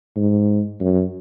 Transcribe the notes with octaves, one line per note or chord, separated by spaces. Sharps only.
G#2
F#2